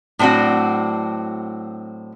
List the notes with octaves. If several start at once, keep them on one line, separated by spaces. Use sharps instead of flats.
A2 F#3 C4 D4 F#4